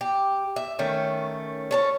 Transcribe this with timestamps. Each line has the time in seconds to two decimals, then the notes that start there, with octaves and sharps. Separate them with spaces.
0.01 G4
0.56 E5
0.79 D#3 A3 C#4
1.71 C#4 A4 C#5